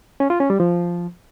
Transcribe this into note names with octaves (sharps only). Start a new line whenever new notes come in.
C#4
F4
C#4
G3
F3